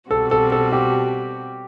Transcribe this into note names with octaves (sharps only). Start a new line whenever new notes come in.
B2 G3 C4 F#4 A4
A4
A4
G4